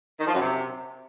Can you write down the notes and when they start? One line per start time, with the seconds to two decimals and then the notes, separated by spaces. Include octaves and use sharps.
0.20 D#3
0.27 F3
0.34 F#2
0.41 C3